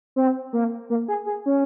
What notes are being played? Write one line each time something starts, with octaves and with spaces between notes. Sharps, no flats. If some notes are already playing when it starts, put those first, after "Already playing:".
C4
A#3
A#3
G#4
G#4
C#4